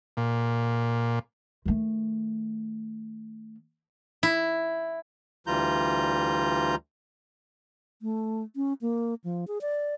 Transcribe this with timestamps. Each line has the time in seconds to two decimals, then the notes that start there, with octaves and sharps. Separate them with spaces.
0.17 A#2
1.66 D#3 A3
4.23 E4
5.47 D2 E3 G3 F4 A#5 G6
8.02 A3
8.56 C#4
8.81 A#3
9.24 F3
9.48 G#4
9.61 D5